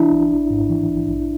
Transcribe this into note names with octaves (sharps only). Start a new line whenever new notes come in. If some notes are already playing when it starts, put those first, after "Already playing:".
Already playing: E3 D4 E4
G#1
G#1
G#2
E3
A#1
A#1